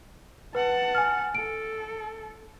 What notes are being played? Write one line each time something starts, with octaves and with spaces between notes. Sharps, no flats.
B4 F#5 A5
G#5 F6
A4 D7